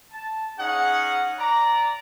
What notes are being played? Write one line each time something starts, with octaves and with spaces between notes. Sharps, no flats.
A5
C#4 D#4 G#4 F5 F#5
D5 A#5